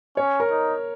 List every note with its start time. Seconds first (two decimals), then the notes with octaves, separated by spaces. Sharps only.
0.17 C#4 C#5
0.40 A#4
0.51 D#4